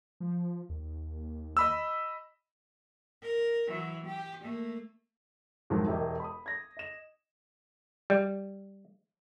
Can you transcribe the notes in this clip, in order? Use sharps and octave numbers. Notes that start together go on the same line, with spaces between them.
F3
D#2
D#5 B5 E6
A#4
E3 F#3
G4
A3 A#3
C2 F2 G#2 D#3 F#3
E1 E4 G4 A#4 D#5
B5 D#6
G#6 A#6
D#5 E7
G3